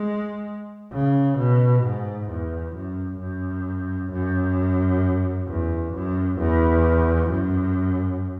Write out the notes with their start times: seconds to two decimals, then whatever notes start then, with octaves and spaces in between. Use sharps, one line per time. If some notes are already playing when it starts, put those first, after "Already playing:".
Already playing: G#3
0.93 C#3
1.38 B2
1.83 G#2
2.29 E2
2.75 F#2
3.20 F#2
4.12 F#2
5.48 E2
5.94 F#2
6.39 E2
7.31 F#2